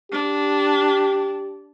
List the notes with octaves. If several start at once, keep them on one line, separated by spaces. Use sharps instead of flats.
D4 G4